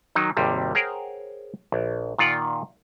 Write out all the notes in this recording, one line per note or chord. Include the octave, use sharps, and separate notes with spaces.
D#3 F#3 D#4
G#1 D#2 C3 G3
G#4 A#4 C5 C#5 F#5 G5
A#1
A#2 D#3 F4 D5 F#5